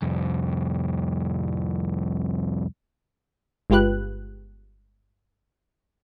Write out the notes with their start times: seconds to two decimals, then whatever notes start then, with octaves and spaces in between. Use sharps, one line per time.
0.02 C2 F2
3.70 G1 G#3 F4 G4 B4 F#6